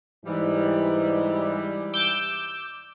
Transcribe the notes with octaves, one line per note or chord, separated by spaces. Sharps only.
G#2 E3 G3
D6 E6 G6